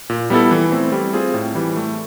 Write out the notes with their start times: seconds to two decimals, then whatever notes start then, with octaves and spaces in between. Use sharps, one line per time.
0.10 A#2
0.30 G3 B3 E4 A4
0.51 E3
0.71 A3 C4
0.92 G3
1.13 C4 F4 G#4
1.34 A2
1.55 E3 G3
1.76 A3